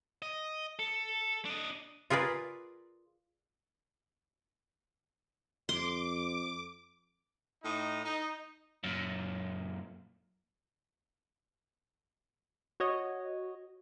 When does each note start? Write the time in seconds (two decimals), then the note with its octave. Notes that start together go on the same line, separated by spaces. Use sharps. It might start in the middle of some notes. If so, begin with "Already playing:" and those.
0.22 D#5
0.79 A4
1.45 D4 D#5
2.10 F4 G#4 A#4 B4 D5
5.69 F2 C6 D6
7.62 A2 D#4
8.04 D#4
8.84 F#2 A#2
12.80 F#4 C#5 D#5